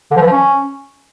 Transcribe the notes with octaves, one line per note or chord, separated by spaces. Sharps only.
D3
F3
E3
F3
C#4